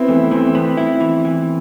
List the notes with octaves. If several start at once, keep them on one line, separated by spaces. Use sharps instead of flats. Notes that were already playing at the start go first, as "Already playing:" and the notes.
Already playing: B3 C4 E4
E3 A3
E3 C4
B3 C4
E4
E3
E3